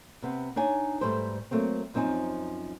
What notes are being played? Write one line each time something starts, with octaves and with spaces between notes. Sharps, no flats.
C3 B3 C4
D4 D#4 C#5 G#5
G#2 G3 A3 B4 C5
F#3 A3 A#3 C4
F#2 F3 C4 D#4 G#5